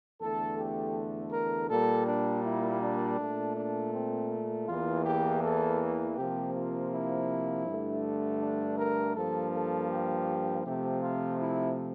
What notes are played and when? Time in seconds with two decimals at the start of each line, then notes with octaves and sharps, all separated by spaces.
0.21 E2 D3 A3 A4
0.58 G4
1.33 A#4
1.70 A#2 G3 A#3 A4
2.07 D4
2.45 E4
2.82 D4
3.20 A#2 A3
3.57 D4
3.93 C4
4.68 E2 E3 A#3 F4
5.06 G4
5.44 A4
6.17 C3 F3 A#3 G4
6.55 F4
6.92 E4
7.66 G2 D3 A3
8.41 D4
8.79 A#4
9.16 G2 F3 A#3 A4
9.54 A4
9.91 G4
10.65 C3 F3 A3 G4
11.02 F4
11.40 E4